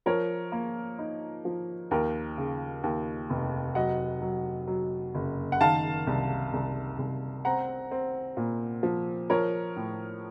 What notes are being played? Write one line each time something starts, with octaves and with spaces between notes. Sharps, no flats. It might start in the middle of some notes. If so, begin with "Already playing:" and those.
F3 A#4 C#5
A#3
D#4
F3
D#2 A#4
C#3
D#2
F1
F#3 D#5 F#5
F#3
F#3
F#1
F#5
D#3 F5 A5
C2
C2
C2
C4 F#5 A#5
C4
A#2
F3
F3 A#4 C#5
A2